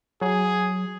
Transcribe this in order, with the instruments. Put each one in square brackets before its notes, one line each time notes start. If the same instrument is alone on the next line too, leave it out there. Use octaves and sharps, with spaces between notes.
[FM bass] F#3 [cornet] G#4